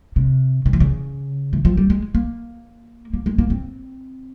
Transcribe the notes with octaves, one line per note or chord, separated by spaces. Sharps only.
C3
C#3
E3
C#3
E3
F3
G3
G#3
A#3
A#3
G#3
A#3
C4